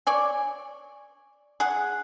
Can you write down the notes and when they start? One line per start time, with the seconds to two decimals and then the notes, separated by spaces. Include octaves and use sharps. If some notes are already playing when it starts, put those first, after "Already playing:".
0.07 C#5 D5 G#5
1.60 G#4 F#5